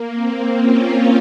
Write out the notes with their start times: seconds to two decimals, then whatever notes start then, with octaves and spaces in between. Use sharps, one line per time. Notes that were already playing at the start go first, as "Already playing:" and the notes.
Already playing: A#3
0.13 C4
0.56 C#4 F4